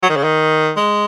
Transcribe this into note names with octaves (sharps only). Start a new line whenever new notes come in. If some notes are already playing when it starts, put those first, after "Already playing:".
F#3
D#3
C#3
D#3
G#3